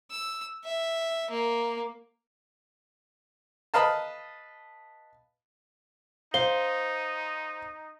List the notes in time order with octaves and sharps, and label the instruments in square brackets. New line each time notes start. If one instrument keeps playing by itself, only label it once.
[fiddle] E6
E5
A#3
[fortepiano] B4 D#5 F5 A5
[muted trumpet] D#4 [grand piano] C5 [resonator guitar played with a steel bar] F5 [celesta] G7